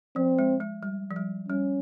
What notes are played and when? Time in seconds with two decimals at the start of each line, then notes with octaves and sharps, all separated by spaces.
0.16 F3 C4
0.39 G#3
0.60 G#3
0.83 G3
1.11 F3
1.16 G3
1.48 G3 C#4